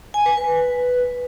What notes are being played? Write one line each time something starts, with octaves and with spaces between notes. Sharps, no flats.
G#5
B4
B4